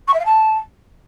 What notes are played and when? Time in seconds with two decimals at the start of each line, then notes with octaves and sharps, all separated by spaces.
0.08 C#6
0.13 E5
0.19 F5
0.25 A5